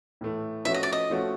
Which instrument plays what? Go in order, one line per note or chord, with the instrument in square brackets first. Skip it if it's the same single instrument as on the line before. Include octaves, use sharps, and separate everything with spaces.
[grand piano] A2 E3 A3
[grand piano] F3 A3 C#4 F#4 [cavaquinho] E5
[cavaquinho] D#5
D5
D#5
[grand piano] F3 A3 C#4 F#4